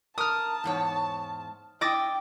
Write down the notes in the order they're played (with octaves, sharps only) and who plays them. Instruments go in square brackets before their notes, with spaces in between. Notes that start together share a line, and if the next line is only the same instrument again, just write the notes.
[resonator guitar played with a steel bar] A#4 [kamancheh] A5 [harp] D#6 F6
[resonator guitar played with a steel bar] E2 G#2 C#5
[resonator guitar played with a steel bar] E4 D#5 [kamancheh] G5 [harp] D6 A6 A#6